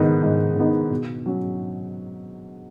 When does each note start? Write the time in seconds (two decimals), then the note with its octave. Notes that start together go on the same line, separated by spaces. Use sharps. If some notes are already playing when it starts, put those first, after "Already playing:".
Already playing: G#2 D#3 B3 D#4
0.23 G#2
0.56 D#3 B3 D#4
0.90 B2
1.26 F#3 C#4